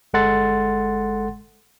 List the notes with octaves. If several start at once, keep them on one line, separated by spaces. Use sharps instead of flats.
G1 G#3 A4 F#5 C6 A6